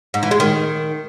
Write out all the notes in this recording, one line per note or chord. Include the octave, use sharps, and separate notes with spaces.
G#2
E3
G#3
D#3